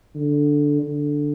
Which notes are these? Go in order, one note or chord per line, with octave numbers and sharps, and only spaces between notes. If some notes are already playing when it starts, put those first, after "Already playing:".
D3
D3